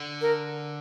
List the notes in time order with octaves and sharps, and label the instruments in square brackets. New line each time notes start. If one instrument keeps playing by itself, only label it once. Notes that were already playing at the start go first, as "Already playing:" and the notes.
Already playing: [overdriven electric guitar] D3
[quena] A#4